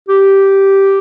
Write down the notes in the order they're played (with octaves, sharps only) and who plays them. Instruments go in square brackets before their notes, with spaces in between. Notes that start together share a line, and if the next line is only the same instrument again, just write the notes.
[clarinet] G4